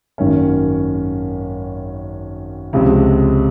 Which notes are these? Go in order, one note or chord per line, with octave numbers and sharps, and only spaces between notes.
G#1 F#2 D#3 A#3 C#4
C#2 C3 F3 G#3 C4